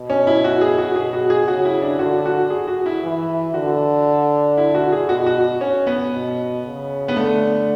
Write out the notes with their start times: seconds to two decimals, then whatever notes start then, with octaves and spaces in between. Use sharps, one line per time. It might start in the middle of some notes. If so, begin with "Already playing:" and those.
Already playing: B2
0.10 C#4
0.27 E4
0.44 F#4
0.61 G#4
0.78 F#4
0.96 B2 G#4
1.13 F#4
1.30 G#4
1.48 C#3 F#4
1.65 E4
1.82 D4
1.99 D3 F#4
2.26 F#4
2.50 G#4
2.68 F#4
2.86 E4
3.03 E3
3.54 D3 F#4
4.57 E4
4.75 F#4
4.92 G#4
5.09 B2 F#4
5.26 F#4
5.61 C#4
5.87 B3
6.13 B2
6.65 C#3
7.08 B3
7.16 D3 A3